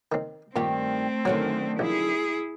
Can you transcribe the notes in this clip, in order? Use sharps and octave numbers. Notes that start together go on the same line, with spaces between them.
D#3 C4
G2 A#2 D#3 A3 C4 G4
F#2 D3 D#3 F#3
A#1 E4 G#4